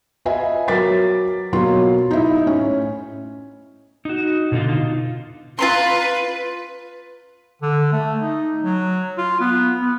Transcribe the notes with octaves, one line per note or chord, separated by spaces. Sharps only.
F4 B4 D#5 E5 G#5
F#3 A#4 D6 A6 B6
B2 F#3 A#3 F4 C6
D#4 E4
A2 C#4
D#4 F#4
B2 D3 A3 D#4 F4
F4 B4 A#5 C6
D3
A3
D#4
F#3
F4
B3
B3